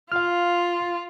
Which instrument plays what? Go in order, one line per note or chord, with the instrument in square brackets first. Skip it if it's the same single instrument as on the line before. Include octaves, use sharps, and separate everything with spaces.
[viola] F4 [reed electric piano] F5 F6